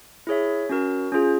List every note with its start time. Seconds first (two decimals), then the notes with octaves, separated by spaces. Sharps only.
0.27 E4 G#4 C#5 E5
0.69 C#4 F#4 A#4
1.12 C#4 F4 G#4